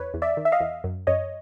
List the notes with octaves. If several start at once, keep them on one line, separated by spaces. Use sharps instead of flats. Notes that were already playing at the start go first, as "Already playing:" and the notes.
Already playing: E2 B4 C#5
E2
D5 E5
D#3
E5
D#5 F5
E2
F#2
F#2 C#5 D#5